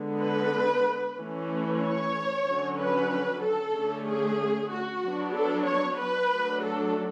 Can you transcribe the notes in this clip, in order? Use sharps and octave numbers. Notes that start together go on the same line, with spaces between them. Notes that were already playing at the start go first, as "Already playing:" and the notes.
Already playing: D3 G#3 B3
B4
E3 A3 C#4
C#5
D3 F#3 C#4
B4
A4
D3 A3 C#4
G#4
F#4
F#3 B3 D4
A4
C#5
B4
F#3 A3 D4
A4